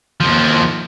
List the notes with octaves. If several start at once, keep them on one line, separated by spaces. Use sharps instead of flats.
D#2 F3